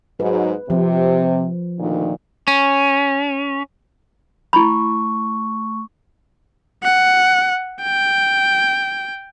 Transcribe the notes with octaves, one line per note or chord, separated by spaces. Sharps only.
G#2 F#3 B4
C3 F3
D2 A#2 D#3
C#4
A3 E4 B5 C#6
F#5
G5